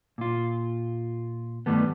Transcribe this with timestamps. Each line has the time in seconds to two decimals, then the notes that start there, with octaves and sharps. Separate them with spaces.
0.18 A#2 F4
1.66 G2 D#3 G3 A3 B3